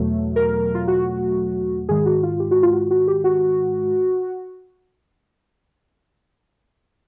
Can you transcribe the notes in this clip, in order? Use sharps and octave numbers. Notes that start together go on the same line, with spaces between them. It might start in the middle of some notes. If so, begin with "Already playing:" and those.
Already playing: E2 B2 F#3 A3
A#4
F4
F#4
G#2 D#3 G#3 G#4
F#4
F4
G4
F#4
F4
F#4
F#4
G4
F#4